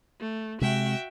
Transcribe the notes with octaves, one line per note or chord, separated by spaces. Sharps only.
A3
C3 G#3 F#4 E5 G5